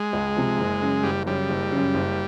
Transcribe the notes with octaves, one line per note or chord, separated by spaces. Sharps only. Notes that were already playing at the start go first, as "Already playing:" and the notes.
Already playing: G#3
C#2
C3 F3
F#1
F#2 C#3
F#1 G3
F#2 C#3 G3
F#1
F#2 C#3
F#1